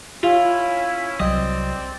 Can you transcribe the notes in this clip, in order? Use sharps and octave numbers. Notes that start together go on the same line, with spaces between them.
C#4 E4 F4
C2 F#3 C4 D5 D#5